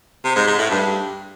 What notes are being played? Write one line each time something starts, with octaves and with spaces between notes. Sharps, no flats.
C3
G#2
G#2
A2
G2